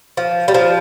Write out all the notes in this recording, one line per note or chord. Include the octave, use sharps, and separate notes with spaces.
F3
G3
F3